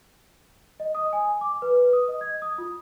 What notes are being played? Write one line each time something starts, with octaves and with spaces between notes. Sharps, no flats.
D#5
D#6
G#5
D6
B4
D#6
D#5
G#6
D#6
F4